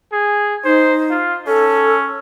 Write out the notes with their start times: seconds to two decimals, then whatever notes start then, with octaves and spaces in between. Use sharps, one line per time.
0.13 G#4
0.65 D#4 C5
1.11 F4
1.47 C#4 A4